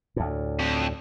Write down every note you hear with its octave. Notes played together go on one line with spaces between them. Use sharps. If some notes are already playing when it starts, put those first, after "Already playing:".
D2 A2
F2